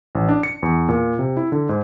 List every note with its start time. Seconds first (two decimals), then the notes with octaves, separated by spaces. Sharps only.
0.15 A1
0.29 D4
0.43 C#7
0.63 E2
0.89 A#2
1.19 C3
1.37 E4
1.52 D3
1.69 G#2